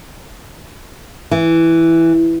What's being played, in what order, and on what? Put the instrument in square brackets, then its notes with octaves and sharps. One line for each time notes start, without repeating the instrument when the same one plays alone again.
[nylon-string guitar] E3